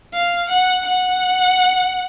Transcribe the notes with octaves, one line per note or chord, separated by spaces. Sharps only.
F5
F#5
F#5